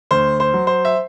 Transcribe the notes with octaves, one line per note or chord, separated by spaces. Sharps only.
D2 C5
C5
F#3
C5
E5